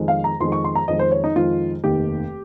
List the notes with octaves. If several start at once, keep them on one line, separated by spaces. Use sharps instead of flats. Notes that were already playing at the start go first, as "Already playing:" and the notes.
Already playing: F2 D#3 G#3
F5
A#5
F2 D#3 G#3 C6
C#6
C6
A#5
F2 D#3 G#3 D#5
C5
C#5
D#4
F2 D#3 G#3 F4
F1 D#2 D#3 G4